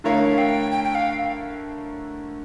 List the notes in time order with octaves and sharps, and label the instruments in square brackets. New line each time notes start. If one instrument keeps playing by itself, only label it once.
[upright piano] D3 A3 E4 A#4 C#5 [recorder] F5
[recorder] G5
G5
G5
F5